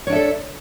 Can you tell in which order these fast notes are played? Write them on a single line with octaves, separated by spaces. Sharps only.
C#5 D4 E5 A4